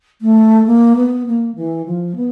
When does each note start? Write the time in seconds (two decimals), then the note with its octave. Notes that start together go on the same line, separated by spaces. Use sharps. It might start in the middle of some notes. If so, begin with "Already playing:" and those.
0.21 A3
0.66 A#3
0.96 B3
1.27 A#3
1.55 E3
1.86 F3
2.16 B3